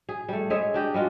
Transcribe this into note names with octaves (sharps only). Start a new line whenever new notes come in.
G#4
G3 A3
G#3 G#4 C#5 E5
D4 G4 D#5
G3 G#3 F4 F#4